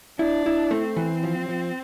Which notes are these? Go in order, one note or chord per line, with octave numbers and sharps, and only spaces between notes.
D4 E4
E4
A3 C4
E3
F3
F3